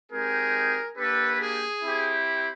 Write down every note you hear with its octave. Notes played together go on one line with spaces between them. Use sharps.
G#3 C4 D#4 G4 G#4 A#4
A#3 D4 G4 A4 B4
G#4
C4 E4 G4